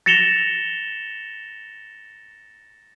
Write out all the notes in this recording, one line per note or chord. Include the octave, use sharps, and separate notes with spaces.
A6 A#6 C#7 E7 F7 G7